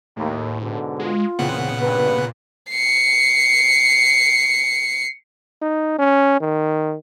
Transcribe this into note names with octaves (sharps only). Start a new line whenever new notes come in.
D#2 A2
G#2 B2 D3
G#3 F4
E2 A#2 C#3 B3 C4 F#5
G2 B4
C7 C#7
D#4
C#4
D#3